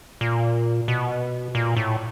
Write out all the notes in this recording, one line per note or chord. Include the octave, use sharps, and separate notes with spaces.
A#2
B2
A#2
A2